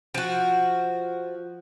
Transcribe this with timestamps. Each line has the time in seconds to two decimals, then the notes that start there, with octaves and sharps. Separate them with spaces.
0.14 F3 F#4